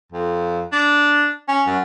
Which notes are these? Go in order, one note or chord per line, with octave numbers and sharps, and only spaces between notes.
F2
D4
C#4
F#2